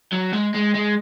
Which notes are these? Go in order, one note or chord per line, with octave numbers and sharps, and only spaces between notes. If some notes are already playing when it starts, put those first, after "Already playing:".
F#3
G#3
G#3
G#3